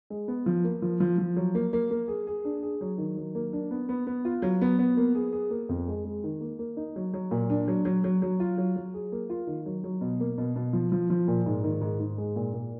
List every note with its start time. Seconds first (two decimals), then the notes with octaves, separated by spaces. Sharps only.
0.10 G#3
0.28 B3
0.46 F3
0.64 A#3
0.82 F3
1.00 F3
1.18 F3
1.36 F#3
1.55 A#3
1.73 A#3
1.91 A#3
2.08 G#4
2.27 G#4
2.45 D4
2.63 G#4
2.81 F#3
2.98 D#3
3.17 F#3
3.35 A#3
3.53 D4
3.71 B3
3.89 B3
4.07 B3
4.25 F4
4.42 F#3
4.61 B3
4.79 B3
4.97 A#3
5.15 G#4
5.33 G#4
5.51 A#3
5.69 F2
5.88 G#3
6.05 G#3
6.24 D#3
6.41 A#3
6.59 A#3
6.77 D#4
6.96 F#3
7.13 F#3
7.31 A#2
7.50 D4
7.68 F#3
7.85 F#3
8.04 F#3
8.22 F#3
8.40 F4
8.58 F#3
8.76 F#3
8.94 G#4
9.12 A#3
9.30 F4
9.47 D#3
9.66 F#3
9.84 F#3
10.01 B2
10.20 A#3
10.38 B2
10.56 B2
10.73 F3
10.92 F3
11.10 F3
11.28 A#2
11.46 G#2
11.64 D#3
11.81 G#2
11.99 G#2
12.18 G#3
12.36 A#2
12.54 A#2